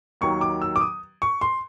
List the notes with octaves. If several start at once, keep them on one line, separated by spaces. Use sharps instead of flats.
D#2 D#3 F#3 C#6
D6
E6
D6
D#6
C#6
C6